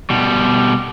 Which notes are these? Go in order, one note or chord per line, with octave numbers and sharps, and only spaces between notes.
B2 G3